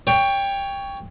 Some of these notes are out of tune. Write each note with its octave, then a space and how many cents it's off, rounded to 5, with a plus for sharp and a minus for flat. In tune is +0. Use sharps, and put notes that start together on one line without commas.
C#5 +15 G5 +15